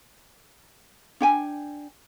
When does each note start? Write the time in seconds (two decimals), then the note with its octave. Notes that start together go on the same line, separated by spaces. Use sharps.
1.21 D4 G5 G#5